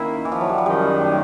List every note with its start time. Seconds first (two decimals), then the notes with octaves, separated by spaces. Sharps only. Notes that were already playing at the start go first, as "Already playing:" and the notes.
Already playing: D#3 A#3 C#4 E4
0.25 E3
0.32 F3
0.41 F#3
0.49 G3
0.58 F3
0.66 F#2 D#3 F#3 G3
1.01 A3